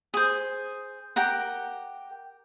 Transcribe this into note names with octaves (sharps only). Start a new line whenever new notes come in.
G#4 C5
G4 A#4 F#5